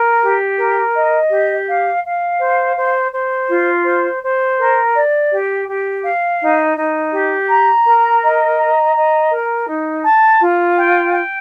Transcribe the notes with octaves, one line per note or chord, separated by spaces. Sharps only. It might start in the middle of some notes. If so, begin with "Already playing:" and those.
Already playing: A#4
G4
A#4
D#5
G4
F5
F5
C5
C5
C5
F4
C5
C5
A#4
D5
G4
G4
F5
D#4
D#4
G4
A#5
A#4
D#5
A#5
D#5
A#4
D#4
A5
F4
G5
G5